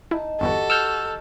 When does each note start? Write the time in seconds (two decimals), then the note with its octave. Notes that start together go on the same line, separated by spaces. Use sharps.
0.11 D#4 E4 A5
0.41 G1 E2 E3 F#4 G4 A4 F#5
0.70 E6 F6 G6 C#7